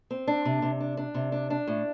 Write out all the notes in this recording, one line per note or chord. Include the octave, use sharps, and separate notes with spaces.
C4
D4
C3
C3
D4
D4
C3
D4
D4
A2